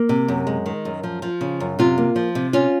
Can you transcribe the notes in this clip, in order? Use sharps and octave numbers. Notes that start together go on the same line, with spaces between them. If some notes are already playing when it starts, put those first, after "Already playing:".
Already playing: A#3
C3
F#2
G#3
D#3
F#2
F3
F3
C#3
F#2
C3 F4
A#3
F3
C3
C#4 F4